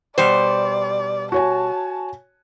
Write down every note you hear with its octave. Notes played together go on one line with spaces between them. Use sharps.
B2 G3 C5 D5
F#4 C#5 G#5 A5